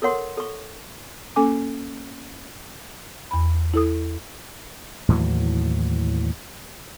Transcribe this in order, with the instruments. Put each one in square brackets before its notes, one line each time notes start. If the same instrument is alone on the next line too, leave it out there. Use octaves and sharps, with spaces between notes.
[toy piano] A4 A#4 C#5 F#5 C6
A4 C#6
[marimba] A#3 C#4 A4 G#5 D6
E2 B5
E4 A4 D#6
[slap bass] D#2 A2 E3 F#3